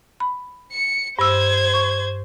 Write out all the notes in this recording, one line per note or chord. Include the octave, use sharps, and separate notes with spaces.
B5
C#7
G2 C5 E6 G#6
C#6